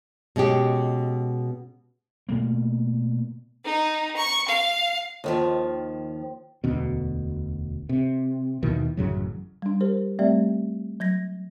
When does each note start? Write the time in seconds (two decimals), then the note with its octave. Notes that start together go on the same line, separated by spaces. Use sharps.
0.36 B2 G#3 C#4 G4
2.29 B2 A3 A#3
3.64 D#4
4.16 C#6
4.48 F5
5.24 D#2 D#3 F3
6.64 E1 D2 B2
7.89 C3
8.63 D#2 B2 D#3 E3
8.97 A1 F#2 C#3 F#3
9.62 G3 D4
9.81 G4 A#4 C5
10.19 G3 A3 C4 G4 D5 E5
11.00 F#3 G#6 A#6